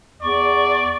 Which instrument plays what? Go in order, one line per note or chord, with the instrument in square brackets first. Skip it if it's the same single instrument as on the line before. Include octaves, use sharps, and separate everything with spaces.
[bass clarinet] E2 [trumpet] D5 [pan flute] C#6